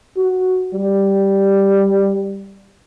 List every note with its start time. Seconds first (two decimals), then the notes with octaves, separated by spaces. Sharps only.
0.17 F#4
0.74 G3